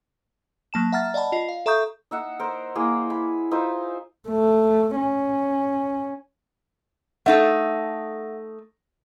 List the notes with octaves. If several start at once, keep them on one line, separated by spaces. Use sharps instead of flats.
F#3 A#3 A5 E7
E5 F#5 A#5 F6 A6
D5 D#5 F#5 A5 B5
F4 D#5 C7
F5
A4 E5 A#5 C#6 D#6 G6
D#4 E5 F#5
A#4 C5
A#3 E4 G#4 C5
B5
D#4 F4 C5 E5
A3
C#4
A3 D#4 A4 E5 F#5